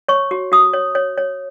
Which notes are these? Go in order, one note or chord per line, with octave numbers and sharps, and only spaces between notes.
C#5 C#6
F#4
F#4 D#6
C#5
C#5
C#5